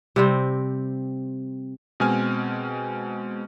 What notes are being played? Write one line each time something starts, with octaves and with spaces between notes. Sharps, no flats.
C3 G3 C4
B2 G#3 C4 G#5 F6